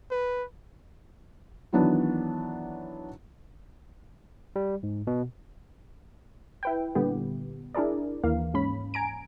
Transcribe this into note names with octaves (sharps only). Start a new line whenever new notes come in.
B4
D#3 E3 F#3 B3 D4
G3
G#2
B2
E4 B4 G5
A#2 D3 G3 B3 G4
D4 E4 G#4 A#4 D5
D#2 E3 A#3 F5
G#2 C#4 B5
G#5 A#5 D7